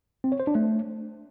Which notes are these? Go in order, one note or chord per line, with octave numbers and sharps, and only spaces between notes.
C4
C#5
C5
D4
A3